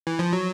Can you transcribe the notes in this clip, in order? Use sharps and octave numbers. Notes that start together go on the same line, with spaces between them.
E3
F3
F#3